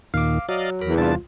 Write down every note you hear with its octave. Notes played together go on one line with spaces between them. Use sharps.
D#2 A#2 D#3 F5 D6
F#3 D5 D#5 F5
E2 A#4 B5
C2 D4 F4 A5